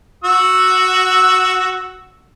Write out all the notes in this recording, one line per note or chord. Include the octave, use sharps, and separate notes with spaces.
F#4 E6